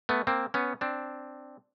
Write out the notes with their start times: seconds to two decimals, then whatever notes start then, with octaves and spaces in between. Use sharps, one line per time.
0.09 A3 B3
0.27 A#3 C4
0.54 B3 C#4
0.81 C4 D4